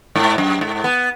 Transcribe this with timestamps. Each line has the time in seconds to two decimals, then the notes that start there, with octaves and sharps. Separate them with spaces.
0.16 G#2
0.38 F#2
0.61 G#2
0.84 B3